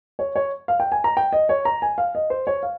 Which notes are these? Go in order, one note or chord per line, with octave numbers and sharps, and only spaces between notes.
C#5
C#5
F5
G5
G#5
A#5
G5
D#5
C#5
A#5
G#5
F5
D#5
C5
C#5
F5